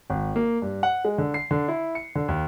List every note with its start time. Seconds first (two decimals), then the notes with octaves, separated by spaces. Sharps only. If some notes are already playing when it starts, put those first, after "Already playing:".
0.10 G#1
0.36 A#3
0.62 G2
0.83 F#5
1.05 G#3
1.18 D3
1.34 C7
1.51 D3
1.68 E4
1.95 C#7
2.15 D3
2.28 D#2